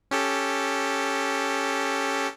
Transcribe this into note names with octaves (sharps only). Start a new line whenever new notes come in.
C#4 G4 A4